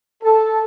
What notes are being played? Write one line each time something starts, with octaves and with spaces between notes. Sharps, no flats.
A4